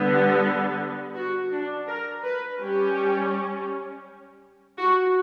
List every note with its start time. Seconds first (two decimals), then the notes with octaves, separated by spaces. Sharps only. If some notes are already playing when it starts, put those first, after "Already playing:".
Already playing: D3 G3 B3
1.15 F#4
1.52 D4
1.88 A#4
2.24 B4
2.60 G3 C#4 G4
4.78 F#4